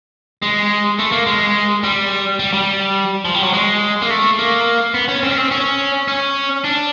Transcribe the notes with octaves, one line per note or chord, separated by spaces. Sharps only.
G#3
A3
A#3
G#3
G3
G3
G3
F3
G3
F#3
G#3
A#3
A3
A#3
B3
C#4
C4
C#4
C4
C#4
C#4
D4